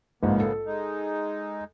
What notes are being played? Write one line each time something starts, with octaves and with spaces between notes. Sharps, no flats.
A#1 G#2 C#3 A#3 B3
A4
G#3 D#4